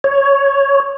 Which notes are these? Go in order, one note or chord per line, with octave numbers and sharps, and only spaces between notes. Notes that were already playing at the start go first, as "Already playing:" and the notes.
C#5